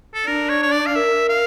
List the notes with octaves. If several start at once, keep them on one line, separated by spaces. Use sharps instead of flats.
A4
D4 A#4
C#5
C#5
D5
F5
A#4 E5
F5